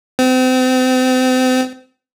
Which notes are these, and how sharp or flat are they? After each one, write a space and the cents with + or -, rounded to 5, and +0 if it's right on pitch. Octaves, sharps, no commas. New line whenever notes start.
C4 -35